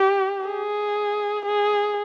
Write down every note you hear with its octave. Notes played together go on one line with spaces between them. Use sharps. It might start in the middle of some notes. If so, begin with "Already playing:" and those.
Already playing: G4
G#4
G#4